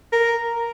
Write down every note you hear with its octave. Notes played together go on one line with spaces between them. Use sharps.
A#4